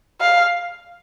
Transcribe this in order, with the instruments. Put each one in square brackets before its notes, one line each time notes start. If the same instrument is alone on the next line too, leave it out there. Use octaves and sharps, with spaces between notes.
[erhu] F5